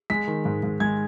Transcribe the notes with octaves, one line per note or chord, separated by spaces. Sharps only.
G#3 B6
D#3
G#2
G#2
G#3 G#6